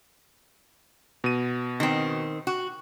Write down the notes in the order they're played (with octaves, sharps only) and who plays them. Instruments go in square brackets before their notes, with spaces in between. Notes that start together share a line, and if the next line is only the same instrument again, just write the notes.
[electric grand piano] B2 D#7
[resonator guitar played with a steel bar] D#3 C4
F#4